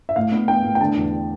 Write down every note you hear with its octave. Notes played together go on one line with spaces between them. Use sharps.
E5
A2 F5
B3
B3 G5
A2
G5
D3 A5
E2